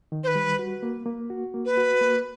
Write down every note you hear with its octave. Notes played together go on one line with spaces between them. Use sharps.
D#3
C5
B4
G3
F#4
A#3
A#3
F#4
A#3
B4
F#4
A#3